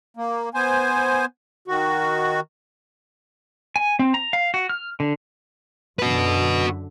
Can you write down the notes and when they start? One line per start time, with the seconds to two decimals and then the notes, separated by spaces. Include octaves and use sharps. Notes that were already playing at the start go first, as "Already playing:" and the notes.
0.17 A#3
0.54 B3 C5 G#5
1.68 D#3 F#4
3.76 G#5
3.99 C4
4.14 A#5
4.33 F5
4.54 F#4
4.69 F6
5.00 D3
5.99 F#2 D3 F#4 B4